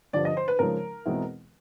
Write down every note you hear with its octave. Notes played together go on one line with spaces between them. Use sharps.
G2 D3 F3 D5
D#5
C5
B4
C#3 F3 G#3 A#4
E2 B2 G#3 C4 E4